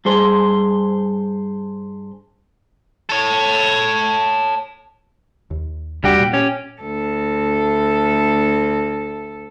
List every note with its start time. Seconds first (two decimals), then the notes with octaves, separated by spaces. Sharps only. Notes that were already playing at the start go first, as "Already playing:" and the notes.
0.05 G2 G#4 C5
3.09 A4 C#5
5.51 D#2
6.04 D#2 C3 G3 D4 F#4 G4
6.19 A#2
6.33 C#4 G4
6.82 D2 A4